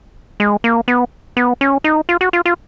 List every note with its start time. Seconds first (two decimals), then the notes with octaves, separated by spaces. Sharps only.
0.40 G#3
0.64 A#3
0.88 B3
1.37 B3
1.61 C#4
1.84 D#4
2.09 F4
2.21 F#4
2.33 F4
2.45 F4